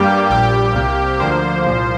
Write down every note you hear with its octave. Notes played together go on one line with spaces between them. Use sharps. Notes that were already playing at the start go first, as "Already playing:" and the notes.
Already playing: G2 G3 A#3 G4
A#1 A#2 G3 G4
C2 C3 A#3
D2 D3 F3 A#3 C5
C2 A#2 F3